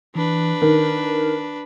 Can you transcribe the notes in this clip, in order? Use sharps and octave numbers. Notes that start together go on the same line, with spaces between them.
E3 D4 B4
D#3 A#4